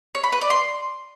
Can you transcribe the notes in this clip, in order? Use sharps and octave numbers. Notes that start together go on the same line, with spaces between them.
C#5
B5
B4
D5
C6